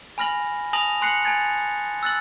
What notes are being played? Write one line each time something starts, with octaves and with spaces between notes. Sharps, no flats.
G#5 B5 F6 A#6 F#7
G#5 A5 D#6 A#6 F7 F#7
G#5 C6 F#6 C7 C#7 F#7
G#5 A5 G#6 A6
E6 F#6 A6 F#7